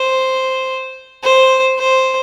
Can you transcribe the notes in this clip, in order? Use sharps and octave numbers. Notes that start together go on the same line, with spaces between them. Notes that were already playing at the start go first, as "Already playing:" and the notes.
Already playing: C5
C5
C5